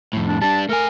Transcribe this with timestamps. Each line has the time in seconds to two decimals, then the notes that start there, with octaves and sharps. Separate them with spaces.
0.13 F2 A2
0.28 D4
0.42 G3 D4 A5
0.69 A3 A#4 G#5